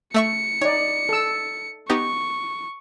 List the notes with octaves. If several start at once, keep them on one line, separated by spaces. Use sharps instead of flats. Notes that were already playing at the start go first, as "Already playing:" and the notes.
A3 E5 C#6 C#7
D#4 C#5 D5
A4 E6
B3 D#4 G4 C#6